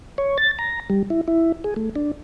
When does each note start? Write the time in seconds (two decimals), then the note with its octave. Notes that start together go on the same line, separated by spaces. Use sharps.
0.18 C#5
0.38 A6
0.59 A#5
0.90 G3
1.10 E4
1.28 E4
1.64 G#4
1.76 A3
1.96 D4